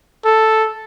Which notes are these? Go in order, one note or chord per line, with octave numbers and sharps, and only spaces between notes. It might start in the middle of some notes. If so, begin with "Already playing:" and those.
A4